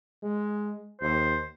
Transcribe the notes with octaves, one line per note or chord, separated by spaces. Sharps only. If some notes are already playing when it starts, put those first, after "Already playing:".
G#3
D#2 C5